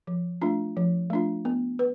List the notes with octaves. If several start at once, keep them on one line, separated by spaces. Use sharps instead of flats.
F3
A3 D4 F4
F3
A3 D4 F4
B3
B4